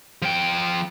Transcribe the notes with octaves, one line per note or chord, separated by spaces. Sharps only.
F3 G5